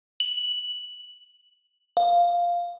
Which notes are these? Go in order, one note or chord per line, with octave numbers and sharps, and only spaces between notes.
F#7
F5